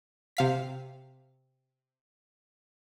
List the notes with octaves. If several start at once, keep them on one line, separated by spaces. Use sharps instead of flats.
C3 F5 B6